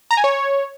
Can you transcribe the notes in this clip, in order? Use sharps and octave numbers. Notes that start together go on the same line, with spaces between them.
A#5
G#5
C#5